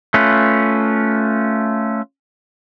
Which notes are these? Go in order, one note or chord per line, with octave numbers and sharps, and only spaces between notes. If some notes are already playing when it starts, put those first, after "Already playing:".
A3 C#4 F4 B4